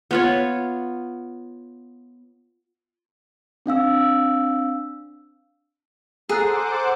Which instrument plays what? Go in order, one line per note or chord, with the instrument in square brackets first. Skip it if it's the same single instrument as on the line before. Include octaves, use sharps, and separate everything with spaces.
[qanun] B3 F4 C#5
[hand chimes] C4 D4 F5 E6
[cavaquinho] G#4 [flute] A4 [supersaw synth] C5 F#5 D6 [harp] A#5 F#6 C7